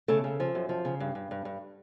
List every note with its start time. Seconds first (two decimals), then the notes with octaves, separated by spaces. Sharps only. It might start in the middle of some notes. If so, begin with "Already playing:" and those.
0.08 C#3 A3
0.24 C#3
0.40 F3
0.55 F#2
0.69 F3
0.85 C#3
1.00 G2
1.15 G2
1.31 G2
1.45 G2